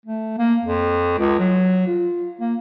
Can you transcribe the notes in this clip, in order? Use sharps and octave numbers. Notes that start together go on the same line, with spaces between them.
A3
A#3
F2
C#2
F#3
F4
A#3